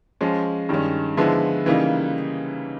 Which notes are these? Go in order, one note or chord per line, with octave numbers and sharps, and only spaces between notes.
F3 G#3 C#4
G2 D#3 G#3 C#4
D3 F3 G#3 B3 E4
C#3 E3 G3 A#3 D#4